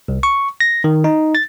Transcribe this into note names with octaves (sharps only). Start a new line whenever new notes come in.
C2
C#6
A#6
D#3
D#4
A6